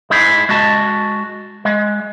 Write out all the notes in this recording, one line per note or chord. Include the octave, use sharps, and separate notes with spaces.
G#3 D#4 E4 G#4
G#3 F#4 A5
G#3